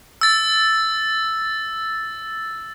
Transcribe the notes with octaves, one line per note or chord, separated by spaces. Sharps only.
E6 A6